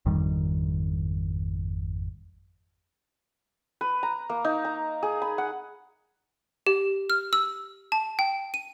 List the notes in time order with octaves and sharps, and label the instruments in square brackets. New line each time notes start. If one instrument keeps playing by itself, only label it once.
[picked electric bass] G#1 F2 D#3 G3
[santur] B4
A#5
A#3
D#4
A#5
G#4
B5
F#5
[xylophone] G4
F6
E6
A5
G5
D#7